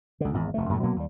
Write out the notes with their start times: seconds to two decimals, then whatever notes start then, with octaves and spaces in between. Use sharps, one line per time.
0.20 C#2 D3
0.34 G#1 E2
0.54 F1 D2 A3
0.69 F#2 A#2 C#3 A3
0.83 B2 F#3 A#3 B3
0.96 D#2 G3